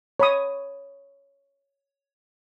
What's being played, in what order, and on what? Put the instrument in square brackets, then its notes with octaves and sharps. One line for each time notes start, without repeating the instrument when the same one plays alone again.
[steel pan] C#5 B5 D#6